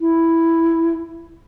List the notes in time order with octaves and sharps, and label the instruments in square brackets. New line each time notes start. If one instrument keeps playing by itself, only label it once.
[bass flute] E4